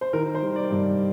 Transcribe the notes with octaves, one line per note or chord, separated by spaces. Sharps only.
C5
D#3 A#4
C5
G3
D5
G2